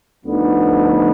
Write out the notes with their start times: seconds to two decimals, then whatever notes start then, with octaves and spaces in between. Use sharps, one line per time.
0.23 D2 D3 F3 B3 D#4